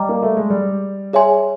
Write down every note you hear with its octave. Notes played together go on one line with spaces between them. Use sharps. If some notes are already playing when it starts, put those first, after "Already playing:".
Already playing: G3 D#5 G5 A#5 D6
A#3
A3
G#3
G3
G#4 C#5 E5 G#5 C6